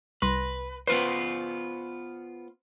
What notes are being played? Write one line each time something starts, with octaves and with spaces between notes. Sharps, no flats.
C2 B4 C6 A#6
B3 F4 B4 C5